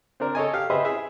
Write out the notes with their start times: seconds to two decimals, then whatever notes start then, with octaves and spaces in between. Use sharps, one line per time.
0.20 C4 D4 A#4
0.35 A4 C#5 D#5 G#5
0.53 G4 F5
0.70 G4 G#4 B4 C5 D#5 E5
0.85 E4 G#4 E5